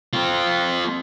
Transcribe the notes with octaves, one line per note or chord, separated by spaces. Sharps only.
C4 F4